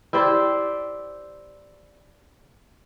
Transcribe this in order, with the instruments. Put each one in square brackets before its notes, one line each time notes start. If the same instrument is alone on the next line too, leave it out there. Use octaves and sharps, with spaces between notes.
[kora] E4 G4 C5 D5